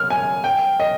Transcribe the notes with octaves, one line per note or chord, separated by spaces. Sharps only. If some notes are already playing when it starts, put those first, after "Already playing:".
Already playing: F6
G#5
G5
D#5